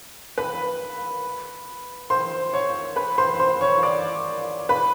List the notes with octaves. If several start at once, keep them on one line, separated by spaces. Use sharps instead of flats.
B4 B5
C5 C6
C#5 C#6
B4 B5
C5 C6
C5 C6
C#5 C#6
D5 D6
B4 B5